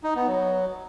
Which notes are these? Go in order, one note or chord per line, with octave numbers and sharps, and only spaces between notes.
D#4
B3
F#3